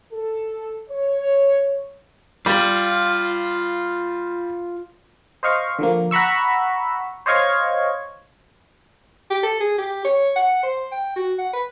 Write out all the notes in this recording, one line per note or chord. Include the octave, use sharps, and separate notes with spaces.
A4
C#5
G3 F4 F5
C5 D#5 F5 C#6
D3 F3 A#3
F#5 A#5 B5 C#6 E6
C5 C#5 D#5 F5 C#6 G#6
G4
A4
G#4
G4
C#5
F#5
C5
G5
F#4
F#5
B4